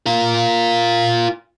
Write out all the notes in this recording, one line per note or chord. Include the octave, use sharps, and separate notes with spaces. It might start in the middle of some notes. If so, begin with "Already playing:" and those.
F4 A#4